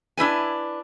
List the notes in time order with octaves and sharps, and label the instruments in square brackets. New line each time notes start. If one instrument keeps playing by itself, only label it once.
[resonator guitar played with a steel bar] D4 E4 B4 G#5